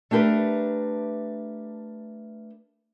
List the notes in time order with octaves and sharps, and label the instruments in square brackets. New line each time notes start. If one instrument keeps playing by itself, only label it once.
[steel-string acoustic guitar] A3 D4 G4 A#4 B4